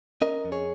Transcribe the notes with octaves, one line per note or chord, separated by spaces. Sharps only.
C#4 A#4 D#5
F2
G#4 C#5